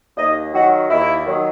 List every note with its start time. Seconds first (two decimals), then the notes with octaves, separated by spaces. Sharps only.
0.17 D#2 D#5
0.53 D#3 F#3 F#4
0.90 D#2 E4
1.26 D#3 F#3